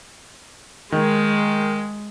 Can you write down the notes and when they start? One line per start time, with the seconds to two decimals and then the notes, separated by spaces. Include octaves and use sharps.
0.92 D#3 G#3